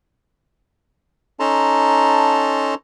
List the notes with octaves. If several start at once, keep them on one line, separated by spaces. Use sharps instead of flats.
C#4 D#4 A4 A5 A#5 C6